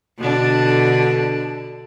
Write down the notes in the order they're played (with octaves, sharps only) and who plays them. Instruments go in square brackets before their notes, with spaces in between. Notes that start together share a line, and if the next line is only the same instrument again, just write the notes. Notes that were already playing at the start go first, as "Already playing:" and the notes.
[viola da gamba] B2 D3 D4